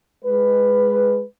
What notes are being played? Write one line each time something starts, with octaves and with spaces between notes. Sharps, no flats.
G#3 B4